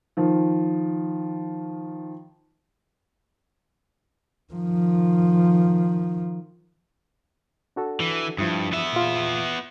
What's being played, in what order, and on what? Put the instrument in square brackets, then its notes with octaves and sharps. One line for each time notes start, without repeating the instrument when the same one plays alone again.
[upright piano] D#3 F3
[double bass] D#3 F3
[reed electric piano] D4 F#4 A4
[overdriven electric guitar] E3
[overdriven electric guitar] G2 [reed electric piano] F3 E4 D#6
[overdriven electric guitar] B3 E5
[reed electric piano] A#2 F4